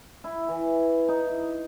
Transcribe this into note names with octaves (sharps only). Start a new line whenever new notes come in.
E4
E3
D#4